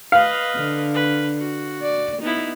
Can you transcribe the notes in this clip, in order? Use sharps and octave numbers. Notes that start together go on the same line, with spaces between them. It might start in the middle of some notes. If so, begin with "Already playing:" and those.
B4 D#5 F5
D3
B4
F#4
D5
B3 D#4 E4